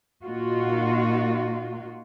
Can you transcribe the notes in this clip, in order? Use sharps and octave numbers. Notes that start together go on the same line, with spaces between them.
A#2 A#3 D#4 F4 F#4